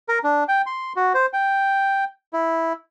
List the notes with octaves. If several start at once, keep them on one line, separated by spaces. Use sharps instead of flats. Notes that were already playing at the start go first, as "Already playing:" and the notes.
A#4
D4
G5
C6
F#4
C5
G5
E4